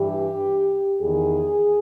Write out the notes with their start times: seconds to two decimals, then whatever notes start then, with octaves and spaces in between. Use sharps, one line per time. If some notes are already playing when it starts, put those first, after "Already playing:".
Already playing: G2 E3 G4
1.00 E2 D#3 G#4